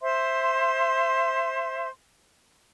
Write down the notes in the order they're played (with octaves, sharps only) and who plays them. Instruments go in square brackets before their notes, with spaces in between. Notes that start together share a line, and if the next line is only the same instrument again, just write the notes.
[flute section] C5 E5 C6